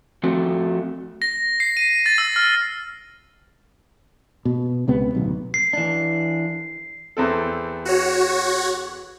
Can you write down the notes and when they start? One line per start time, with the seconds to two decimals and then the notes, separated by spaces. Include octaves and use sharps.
0.23 F3 A3 C4 F#4 A4
1.22 A#6
1.60 C7
1.77 D#7
2.06 A6
2.18 E6
2.36 F6
4.45 B2
4.88 C#2 C3 B3
5.15 D1 B1
5.54 C7
5.73 E3 D4
7.17 E2 C4 A4
7.85 F#4 C#5